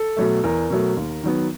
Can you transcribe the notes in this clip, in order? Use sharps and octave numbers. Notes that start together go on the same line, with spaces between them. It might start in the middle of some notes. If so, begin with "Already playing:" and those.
Already playing: A4
B2 F#3 A3
E2 A#4
B2 F#3 A3
D#2
D#3 F#3 B3